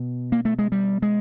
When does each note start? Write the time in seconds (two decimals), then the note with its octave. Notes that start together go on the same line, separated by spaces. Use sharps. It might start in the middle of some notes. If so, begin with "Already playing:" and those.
Already playing: B2
0.32 A#3
0.45 A3
0.59 G#3
0.72 G3
1.02 G#3